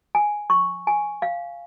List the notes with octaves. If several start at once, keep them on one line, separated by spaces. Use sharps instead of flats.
G#5
C#6
G#5
F5